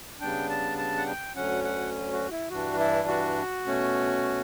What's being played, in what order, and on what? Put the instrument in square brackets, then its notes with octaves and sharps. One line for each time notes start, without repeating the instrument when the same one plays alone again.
[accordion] C#3 G3 B3 D4 G5
A5
A5
F#5
G5
D2 D3 F#3 C#4 F#5
F#5
F#4
E4
G2 E3 G3 D4 F#4
E4
F#4
B2 A3 C#4